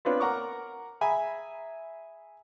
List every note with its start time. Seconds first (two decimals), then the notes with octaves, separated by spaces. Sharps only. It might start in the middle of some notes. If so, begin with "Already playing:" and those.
0.05 B3 C4 D4 F4 B4 C#5
0.20 A#4 F#5 A#5 C#6 D6
1.01 G#4 E5 G#5 A#5 B5